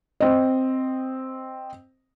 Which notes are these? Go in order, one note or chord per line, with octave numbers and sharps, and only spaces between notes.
C4 D#5